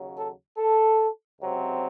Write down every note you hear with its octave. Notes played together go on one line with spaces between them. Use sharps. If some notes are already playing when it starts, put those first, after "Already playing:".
Already playing: D#2 C#3 F#3
A4
A4
C#2 C3 F#3 C4